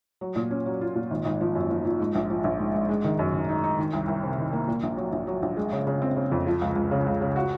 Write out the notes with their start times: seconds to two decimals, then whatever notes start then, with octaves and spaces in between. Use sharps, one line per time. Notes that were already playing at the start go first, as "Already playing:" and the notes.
0.21 F#3
0.36 A#2
0.51 C#4
0.66 F#3
0.81 F4
0.96 A#2
1.11 G#1
1.25 G#1
1.41 F3
1.55 F#2
1.70 F3
1.85 F3
2.00 G#2
2.15 A#1
2.30 F3
2.44 A#1
2.59 G#2
2.74 G#2
2.89 G#3
3.04 D#3
3.19 F#2
3.33 D#3
3.49 D#4
3.64 D#4
3.79 D#3
3.93 C2
4.08 C2
4.23 C3
4.38 D#3
4.53 A#3
4.68 A#2
4.83 A#1
4.97 F#3
5.12 A#1
5.27 F#3
5.42 A#1
5.57 G#3
5.72 C#3
5.87 C#3
6.02 C4
6.17 C#3
6.32 F2
6.46 F3
6.61 C#2
6.76 C#2
6.91 C#3
7.06 C#2
7.21 C#3
7.36 F#4